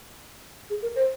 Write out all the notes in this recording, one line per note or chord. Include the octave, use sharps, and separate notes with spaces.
G#4
A#4
C5